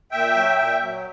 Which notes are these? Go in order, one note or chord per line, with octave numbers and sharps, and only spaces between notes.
A#2 E5 G5
F#3
A#2
F#3